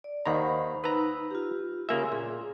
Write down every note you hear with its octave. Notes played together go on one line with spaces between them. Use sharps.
D5
D#2 D#3 C5 F#5 A#5 B5
D#4 B4 A#5 B5 E6
F4 G4
C#3 A#3 E5 G#5 C6
A#2 G#4